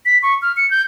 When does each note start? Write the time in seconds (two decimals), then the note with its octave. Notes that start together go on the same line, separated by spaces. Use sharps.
0.06 B6
0.23 C#6
0.42 F6
0.57 C#7
0.71 G6